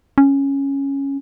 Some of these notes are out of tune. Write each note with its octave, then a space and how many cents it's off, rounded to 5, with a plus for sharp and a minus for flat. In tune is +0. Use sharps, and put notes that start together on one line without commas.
C#4 -5